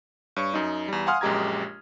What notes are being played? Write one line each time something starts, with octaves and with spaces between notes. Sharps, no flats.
G2 C#5 C#6
F#2 D#4
E2 G3
F5 F#5 G#5 C6 D#6 F6
A#1 F#2 G#3 G4 A#5 G#6